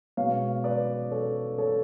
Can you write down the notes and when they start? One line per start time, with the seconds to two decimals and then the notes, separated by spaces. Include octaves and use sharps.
0.17 B2 G#3 B3 C#5 F5
0.64 B4 D5
1.11 A4 C#5
1.58 A4 C#5